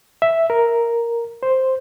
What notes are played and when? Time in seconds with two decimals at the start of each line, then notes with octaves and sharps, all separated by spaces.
0.22 E5
0.50 A#4
1.43 C5